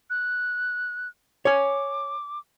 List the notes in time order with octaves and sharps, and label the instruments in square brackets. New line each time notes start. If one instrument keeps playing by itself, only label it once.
[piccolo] F#6
[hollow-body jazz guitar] C#5 G#5 [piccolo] D6